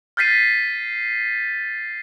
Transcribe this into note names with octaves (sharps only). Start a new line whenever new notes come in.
F6 G6 A6 B6 C7 D#7